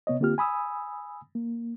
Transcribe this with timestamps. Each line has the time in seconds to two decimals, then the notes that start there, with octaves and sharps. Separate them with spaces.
0.07 C3 B3 C#5 D#5
0.20 D3 A#3 C4 F4 G4 F6
0.38 G#5 B5 D#6 E6
1.35 A#3